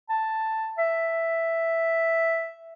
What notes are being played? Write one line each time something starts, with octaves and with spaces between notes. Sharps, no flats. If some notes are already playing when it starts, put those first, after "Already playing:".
A5
E5